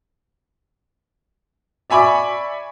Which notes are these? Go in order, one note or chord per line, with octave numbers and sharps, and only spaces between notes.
D5 E5 G#5 B5 C#6 D6